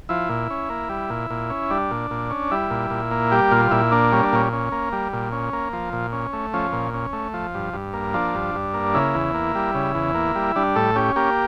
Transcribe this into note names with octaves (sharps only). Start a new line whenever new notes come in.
F3 E4
A#2
C#4
A#3
G3
A#2
A#2
C#4
G3 D4
A#2
A#2
C#4
G3 E4
A#2
A#2
A#3
G3 G4
A#2 F4
A#2 E4
A#3 D4
G3 C#4
D4
A#2 C#4
C#4
A#3
G3
A#2
C#4
A#3
F3
A#2
C#4
A3
F3 C#4
A#2
C#4
A3
F3
G2
G2
A#3
F3 D4
G2
G2
A#3
C#3 E4
E2
A#3
G3
C#3
E2
A#3
G3
G3 D4
A2 A4
C#4 G4
A#3 G4